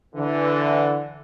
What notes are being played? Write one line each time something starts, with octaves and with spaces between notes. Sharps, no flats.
D3 E3